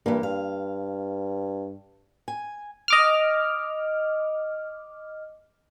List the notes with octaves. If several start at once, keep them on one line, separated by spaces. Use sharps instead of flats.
G2 E3 A#3
G2 F5
G#5
D#5 D6 F6